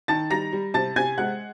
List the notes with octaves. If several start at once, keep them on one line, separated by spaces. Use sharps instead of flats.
D#3 A5 A6
G3 A#5 A#6
G3
C3 A5 A6
C3 G#5 G#6
G#3 F#5 F#6